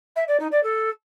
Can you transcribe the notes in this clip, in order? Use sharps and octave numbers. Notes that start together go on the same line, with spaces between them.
E5
D5
D#4
D5
A4